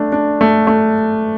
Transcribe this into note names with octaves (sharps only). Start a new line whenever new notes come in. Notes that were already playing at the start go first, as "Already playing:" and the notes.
Already playing: A3 D4
D4
A3
A3